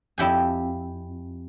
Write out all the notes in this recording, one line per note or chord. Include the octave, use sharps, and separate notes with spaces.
F2 E4 G4 G#5